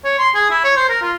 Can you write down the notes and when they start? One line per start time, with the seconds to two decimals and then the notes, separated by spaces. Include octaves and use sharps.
0.04 C#5
0.19 C6
0.34 G#4
0.50 E4
0.64 C#5
0.76 C5
0.89 A#4
1.02 F4